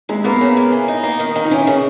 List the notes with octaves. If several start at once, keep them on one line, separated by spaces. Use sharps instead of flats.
G#3 E4
A#3 B3
C#3
A#3
E3
D#4
A#3
D#3
D#3
D#4
E3 C#4
C#3